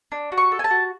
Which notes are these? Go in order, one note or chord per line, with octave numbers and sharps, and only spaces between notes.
D4
F#4
C#6
A4
G#5
A5
F#4